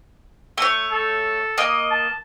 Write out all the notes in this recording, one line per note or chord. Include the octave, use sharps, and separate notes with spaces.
A3 C#5
A4
A#3 D#5
A5